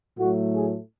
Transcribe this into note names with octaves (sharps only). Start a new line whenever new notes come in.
A2 F#3 A3 F#4
G#4